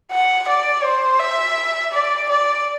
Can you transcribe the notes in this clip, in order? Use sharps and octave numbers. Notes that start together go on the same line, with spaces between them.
F#5
D5
C5
E5
D5
D5